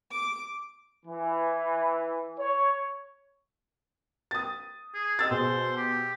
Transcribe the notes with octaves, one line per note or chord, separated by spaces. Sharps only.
D6
E3
C#5
D#6 A6
G#4
D#5 E6 A6
B2 G#4 C5
G4